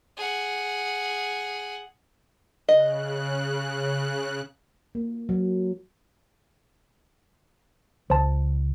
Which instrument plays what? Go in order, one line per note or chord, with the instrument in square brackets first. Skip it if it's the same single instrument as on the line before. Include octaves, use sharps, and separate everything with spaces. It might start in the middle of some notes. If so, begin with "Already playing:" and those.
[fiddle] G#4 F#5
[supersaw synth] C#3 F#6 [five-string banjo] D#5
[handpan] A#3
F#3
[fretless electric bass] C#2 [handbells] C5 A5